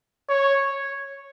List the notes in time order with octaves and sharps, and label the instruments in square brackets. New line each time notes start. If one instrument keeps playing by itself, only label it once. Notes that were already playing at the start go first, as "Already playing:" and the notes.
[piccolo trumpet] C#5